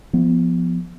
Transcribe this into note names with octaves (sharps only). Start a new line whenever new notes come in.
F3 B3